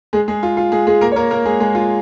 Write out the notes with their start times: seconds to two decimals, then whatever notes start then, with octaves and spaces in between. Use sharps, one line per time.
0.13 G#3 G#4
0.28 G#3 G#4
0.43 F4
0.57 F4
0.72 G#3 G#4
0.87 G#3 G#4
1.01 A#3 A#4
1.12 C#5
1.16 A#3 A#4
1.31 A#3 A#4
1.46 G#3 G#4
1.60 G#3 G#4
1.75 F4